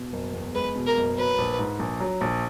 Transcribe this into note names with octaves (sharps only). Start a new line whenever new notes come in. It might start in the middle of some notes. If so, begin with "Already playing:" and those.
Already playing: B2
F#1
E2
G#3 B4
B2
A#4
F#1
F#3 B4
A#1
G#2
A#1
F#3
A#1